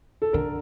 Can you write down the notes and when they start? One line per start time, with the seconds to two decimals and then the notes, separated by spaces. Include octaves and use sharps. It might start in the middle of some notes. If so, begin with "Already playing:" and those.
0.22 A4
0.33 D3 A#4